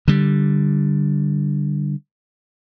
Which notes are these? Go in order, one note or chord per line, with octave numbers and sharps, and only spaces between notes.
D3 G3